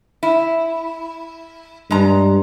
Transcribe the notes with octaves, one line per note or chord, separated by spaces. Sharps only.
E4
G2 G#3 A#5